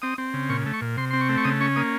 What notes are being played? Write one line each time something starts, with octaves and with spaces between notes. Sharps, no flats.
C4 D#6
C4
C#3
A#2 C#6
A3
C#6
A#2
C3 C6
C4 C6
C#6
A3
C#6
C#3 D#6
C#4 C#6
A#3 D#6